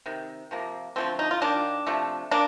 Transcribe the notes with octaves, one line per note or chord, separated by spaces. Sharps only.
C3 D#3
C3 F3 A#3
D3 F3 A3 C4
D#4
F4
D#3 A#3 D4
C3 F3 A3
A#3 D4